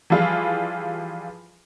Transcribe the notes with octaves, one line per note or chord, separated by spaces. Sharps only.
E3 F3 G3 F4 G#4